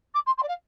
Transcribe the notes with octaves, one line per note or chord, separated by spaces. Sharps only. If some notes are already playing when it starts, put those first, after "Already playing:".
D6
C6
C6
D5
F5